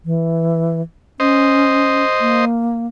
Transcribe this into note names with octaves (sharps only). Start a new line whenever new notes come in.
E3
C#4 C5 D#5
A#3